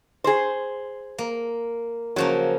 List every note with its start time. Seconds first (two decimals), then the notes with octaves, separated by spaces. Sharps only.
0.24 G#4 C5
1.18 A#3
2.16 C#3 F3 F#3 A#3